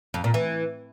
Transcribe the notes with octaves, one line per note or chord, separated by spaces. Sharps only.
F2
A#2
E3